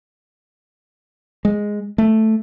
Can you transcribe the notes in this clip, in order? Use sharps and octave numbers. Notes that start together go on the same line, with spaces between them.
G#3
A3